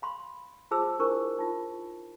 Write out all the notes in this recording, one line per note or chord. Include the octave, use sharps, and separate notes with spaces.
F5 B5 C6
F4 G#4 C5 A5 D6 E6
D4 E4 A#4 C5 C#6 E6
D#4 F4